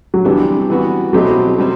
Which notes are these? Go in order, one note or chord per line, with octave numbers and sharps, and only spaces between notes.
F#3
C3 E3 G3 B3 D4
E3 B3 F#4
B2 F#3 A3 C4 E4 G4
C3 G3 C4